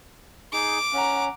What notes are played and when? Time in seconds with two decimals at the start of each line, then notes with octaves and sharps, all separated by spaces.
0.53 D#4 G#4 D6
0.93 C#4 F#5 A#5